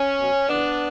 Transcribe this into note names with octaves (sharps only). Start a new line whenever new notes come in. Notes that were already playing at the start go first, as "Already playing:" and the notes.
Already playing: C#4
B2 F#3
C#3 E3 B3 D4